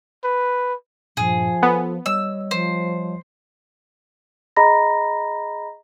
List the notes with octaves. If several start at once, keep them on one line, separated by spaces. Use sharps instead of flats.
B4
G2 A#2 F3 G#4
B3 F4 A4
G3 C#5 D#5 E6
F3 C5
G#4 D#5 A#5 B5 A#6